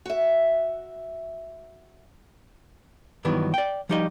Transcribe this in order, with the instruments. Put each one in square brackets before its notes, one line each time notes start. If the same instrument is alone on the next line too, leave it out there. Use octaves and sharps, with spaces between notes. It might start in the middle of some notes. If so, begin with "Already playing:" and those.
[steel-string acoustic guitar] F#4 E5
[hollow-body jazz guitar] G2 D#3 E3 F#3 B3
D5 G5
F3 G3 D#4 G4 D5 D#5